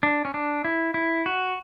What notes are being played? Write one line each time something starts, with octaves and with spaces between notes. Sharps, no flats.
D4
C#4
D4
E4
E4
F#4